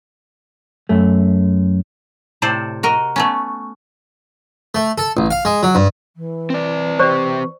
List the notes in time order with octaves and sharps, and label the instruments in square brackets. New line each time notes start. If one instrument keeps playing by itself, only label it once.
[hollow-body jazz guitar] F#2 A3
[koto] A2 C3 A4 C5 D5
F#4 A#4 D#5
A3 B3 C#4
[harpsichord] A3
A4
A1
F5
G#3
F#3
G2
[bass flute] E3
[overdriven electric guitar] C4 D5
[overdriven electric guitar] C4 G4 [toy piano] C5 D5 [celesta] C#6